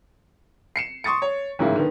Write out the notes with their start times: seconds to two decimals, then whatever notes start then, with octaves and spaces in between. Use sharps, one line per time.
0.76 C7 C#7 E7
1.04 C6 C#6 D#6 A6 C#7
1.22 C#5
1.59 A1 G#2 C#3 A#3 E4
1.76 D3 D#3 B3